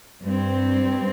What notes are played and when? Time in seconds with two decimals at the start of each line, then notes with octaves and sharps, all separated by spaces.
0.23 G2 G3 C4